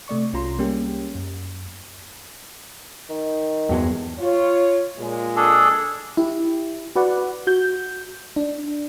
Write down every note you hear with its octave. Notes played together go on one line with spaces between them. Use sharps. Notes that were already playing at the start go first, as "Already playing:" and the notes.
C3 A3 D5 C#6
C2 C#4 F4 A#5 C6
G3 G#3 A#3 C#4 G4
F#2
D#3
E2 G2 F#3 G#3
F4 C#5
A#2 G#3
D4 G#4 A4
E4 G4
F#4 B4 D5 F#5
F#4 G6
D4